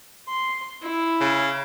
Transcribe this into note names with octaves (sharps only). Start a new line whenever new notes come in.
C6
E4
C#3